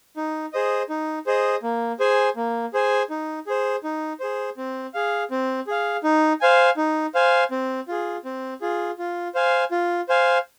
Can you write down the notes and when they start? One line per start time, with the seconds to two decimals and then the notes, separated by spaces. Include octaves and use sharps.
0.17 D#4
0.53 G#4 C5 D#5
0.89 D#4
1.27 G#4 C5 D#5
1.63 A#3
1.99 G#4 C5 G#5
2.36 A#3
2.73 G#4 C5 G#5
3.10 D#4
3.47 G#4 C5
3.84 D#4
4.20 G#4 C5
4.57 C4
4.94 G#4 F5
5.31 C4
5.67 G#4 F5
6.04 D#4
6.41 C5 F5 G#5
6.77 D#4
7.15 C5 F5 G#5
7.51 C4
7.88 F4 G#4
8.25 C4
8.61 F4 G#4
8.99 F4
9.35 C5 F5 G#5
9.71 F4
10.09 C5 F5 G#5